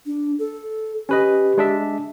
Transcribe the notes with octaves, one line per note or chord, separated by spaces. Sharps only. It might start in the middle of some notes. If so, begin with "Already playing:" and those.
D4
A4
C#4 G4 B4 D#5
G#3 D4 E5